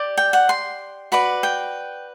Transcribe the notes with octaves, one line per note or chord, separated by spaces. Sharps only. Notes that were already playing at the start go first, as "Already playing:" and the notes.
Already playing: G4 D5
G5
F#5
C6
F#4 B4 D5 B5
G5